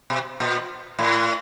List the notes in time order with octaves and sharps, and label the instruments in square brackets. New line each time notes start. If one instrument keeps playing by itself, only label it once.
[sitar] B2
A#2
A2